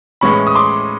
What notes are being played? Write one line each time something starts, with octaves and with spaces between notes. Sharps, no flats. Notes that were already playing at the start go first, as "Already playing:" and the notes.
A2 E3 G#3 C#4 B5 C#6
D#6
C6 D6